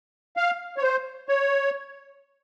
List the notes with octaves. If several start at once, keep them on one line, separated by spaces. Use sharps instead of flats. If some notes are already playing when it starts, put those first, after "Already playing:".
F5
C#5
C5
C#5